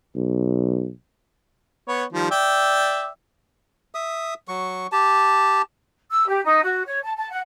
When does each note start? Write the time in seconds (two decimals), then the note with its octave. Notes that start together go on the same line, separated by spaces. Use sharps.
0.15 B1
1.88 B3 C#5
2.13 D#3 F3 G3
2.31 D5 E5 G5
3.95 E5 D#6
4.48 F#3 C#6
4.92 G4 A5
6.10 E6
6.27 G4
6.44 D#4
6.63 F#4
6.86 C#5
7.02 A5
7.16 A5
7.30 F#5